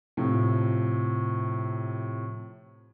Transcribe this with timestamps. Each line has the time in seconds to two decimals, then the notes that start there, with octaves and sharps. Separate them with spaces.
0.17 A2 C3 F3